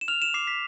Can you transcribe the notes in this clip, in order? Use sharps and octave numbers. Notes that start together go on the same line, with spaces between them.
E7
F6 F7
E7
D6 C7
B6